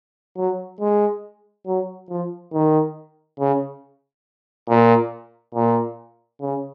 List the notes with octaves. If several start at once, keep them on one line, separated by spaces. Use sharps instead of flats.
F#3
G#3
F#3
F3
D#3
C#3
A#2
A#2
C#3